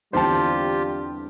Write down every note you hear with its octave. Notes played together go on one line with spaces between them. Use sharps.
E2 D3 G3 C4 F4 G4 C5 A5